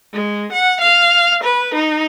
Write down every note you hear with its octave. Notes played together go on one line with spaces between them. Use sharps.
G#3
F#5
F5
B4
D#4